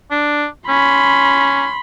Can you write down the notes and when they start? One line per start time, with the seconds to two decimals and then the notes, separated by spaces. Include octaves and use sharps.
0.12 D4
0.69 C#4 B5 C6